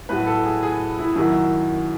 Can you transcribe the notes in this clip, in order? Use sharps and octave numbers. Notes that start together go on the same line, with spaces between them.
A2 F#3 B4
A4
G#4
G#4
E4
F#2 D#3 F#3 E4